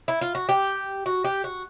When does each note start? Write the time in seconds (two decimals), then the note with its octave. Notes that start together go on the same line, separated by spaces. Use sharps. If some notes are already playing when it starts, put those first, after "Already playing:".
0.08 E4
0.21 F4
0.35 F#4
0.49 G4
1.06 F#4
1.25 G4
1.44 F#4